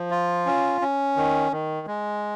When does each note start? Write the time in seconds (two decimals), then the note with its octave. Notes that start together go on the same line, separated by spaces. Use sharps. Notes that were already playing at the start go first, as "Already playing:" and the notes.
Already playing: F3
0.11 F4
0.46 C#4
0.81 C#4
1.17 D#3
1.52 D#3
1.87 G#3